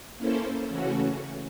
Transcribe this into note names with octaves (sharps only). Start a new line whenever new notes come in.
A#3 C#4 E4 A4 C5
C#3 E3 A3 C#4 F#4